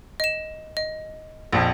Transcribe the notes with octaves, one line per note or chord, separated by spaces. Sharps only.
D#5 E7
D#5
A#1 F2